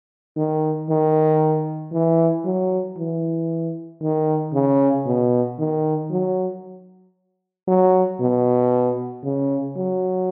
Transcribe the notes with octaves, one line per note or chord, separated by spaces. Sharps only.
D#3
D#3
E3
F#3
E3
D#3
C#3
B2
D#3
F#3
F#3
B2
C#3
F#3